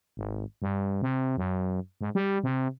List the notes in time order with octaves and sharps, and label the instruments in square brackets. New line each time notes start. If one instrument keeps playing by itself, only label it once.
[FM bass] G#1
G2
C3
F#2
G#2
G3
C3